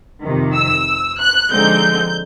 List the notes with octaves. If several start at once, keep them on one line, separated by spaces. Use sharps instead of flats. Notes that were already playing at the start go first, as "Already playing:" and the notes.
F2 C3 D#3
E6
F#6
D3 F3 G#3 C4 D#4 G6